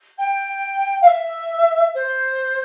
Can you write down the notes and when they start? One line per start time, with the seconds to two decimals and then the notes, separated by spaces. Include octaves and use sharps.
0.18 G5
1.01 F5
1.06 E5
1.94 C5